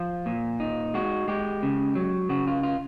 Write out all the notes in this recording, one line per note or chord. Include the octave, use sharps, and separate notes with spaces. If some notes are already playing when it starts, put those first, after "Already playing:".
Already playing: F3 F4
A#2
D#4
G#3 F#4
G#3 G4
C#3
F#3
C#3 F#4
F4
F4